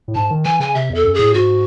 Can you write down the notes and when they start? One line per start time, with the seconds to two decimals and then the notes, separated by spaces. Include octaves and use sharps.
0.08 A2
0.15 G#2 A5
0.30 D#3
0.45 E3 G#5
0.60 C#3 G#5
0.75 C3 E5
0.90 E2 A4
1.05 F#2
1.14 G#4
1.19 A2
1.34 G#2 F#4